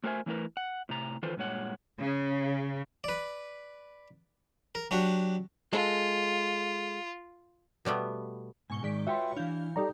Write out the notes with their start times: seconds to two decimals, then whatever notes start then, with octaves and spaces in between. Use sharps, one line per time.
0.04 A3 F#4 A#4 C5 E5 G#5
0.26 E3 F#3 A3 E4 A#4 B4
0.57 F#5
0.89 A2 C3 A#5
1.23 D#3 E3 F4 A4 B4 C5
1.36 G2 A#2 G#3 C#5 F#5
1.98 C#3
3.04 B4 D5
4.75 A#4
4.91 F#3 D4 F#4 G4
5.73 G#3 F4 A4
7.85 B2 G3 A3 B3
8.70 G#2 B2 G#5 C#6 G7
8.83 G#2 D#3 G#3 D5 B6
9.07 F4 F#4 B4 C#5 E5 G5 C6
9.37 E3 D4 E4 F5 G6
9.76 G3 D#4 G4 A4 D5 A#5